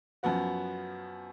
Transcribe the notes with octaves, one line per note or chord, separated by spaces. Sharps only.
F#2 F3 B3 F#4